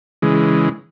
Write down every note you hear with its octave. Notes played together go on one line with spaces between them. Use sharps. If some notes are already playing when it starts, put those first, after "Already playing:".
C#3 E3 G#3